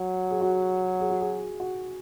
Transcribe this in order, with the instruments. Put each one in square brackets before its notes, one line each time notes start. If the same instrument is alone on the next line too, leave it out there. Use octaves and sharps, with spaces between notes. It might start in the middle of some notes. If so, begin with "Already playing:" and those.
Already playing: [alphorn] F#3
[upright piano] G#4
F#4
G#4
F#4
G#4
F#4